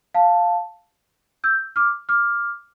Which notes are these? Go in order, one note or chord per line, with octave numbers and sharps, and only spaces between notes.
F5 A5
E6 G6
D6 F6
D6 F6